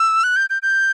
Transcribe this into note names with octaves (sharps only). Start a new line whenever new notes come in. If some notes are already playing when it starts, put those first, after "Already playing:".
Already playing: E6
F#6
G6
G6
G6